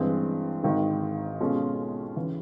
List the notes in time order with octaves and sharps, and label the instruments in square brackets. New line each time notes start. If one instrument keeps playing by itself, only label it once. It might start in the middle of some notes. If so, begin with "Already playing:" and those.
Already playing: [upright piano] G2 E3 G#3 C4
G#1 G#2 D#3
B2 G#3 C#4 F4 A4
C#3 E3